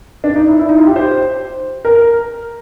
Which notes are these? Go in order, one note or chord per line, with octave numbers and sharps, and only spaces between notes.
D4
D#4
E4
E4
D#4
F4
G4
C5
A#4